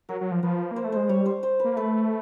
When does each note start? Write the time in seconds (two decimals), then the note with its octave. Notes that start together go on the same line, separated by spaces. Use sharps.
0.09 F#3 A#4
0.21 F#3
0.32 F3
0.43 F3 B4
0.71 A#3
0.76 C5
0.84 A3
0.92 G#3 C5
1.09 G3 C#5
1.26 C5
1.43 C5
1.60 A#3 B4
1.77 A3 B4